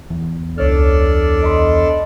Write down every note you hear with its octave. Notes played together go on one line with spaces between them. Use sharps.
E2
C#2 D4 A4 C#5 D5 F6
D#5 B5 C6